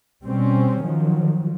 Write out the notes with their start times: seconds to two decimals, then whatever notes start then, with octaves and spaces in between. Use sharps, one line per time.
0.25 B2 G3 C4 C#4
0.82 D#3 F3 F#3